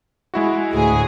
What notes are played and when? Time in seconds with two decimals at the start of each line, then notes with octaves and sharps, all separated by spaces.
0.34 G#3 E4 F#4
0.73 D2 A2 G#4